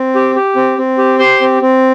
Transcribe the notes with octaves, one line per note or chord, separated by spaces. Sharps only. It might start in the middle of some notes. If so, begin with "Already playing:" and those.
Already playing: C4
G4
G4
C4
C4
G4
G4 C5 C6
C4
C4